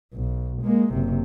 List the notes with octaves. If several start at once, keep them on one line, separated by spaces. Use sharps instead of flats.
B1
G#3 A#3
F#1 C3